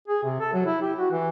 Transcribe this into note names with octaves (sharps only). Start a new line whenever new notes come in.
G#4
C3
A4
F#3
E4
G4
F#4
E3